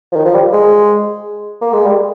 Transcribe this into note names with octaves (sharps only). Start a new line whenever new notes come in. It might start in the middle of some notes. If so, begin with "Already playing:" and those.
F3
D#3
F3
G3
G#3
A#3
G#3
G3